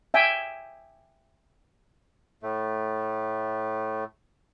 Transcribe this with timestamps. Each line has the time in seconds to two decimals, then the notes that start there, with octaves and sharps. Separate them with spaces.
0.14 E5 G5 G#5
2.43 A2 A3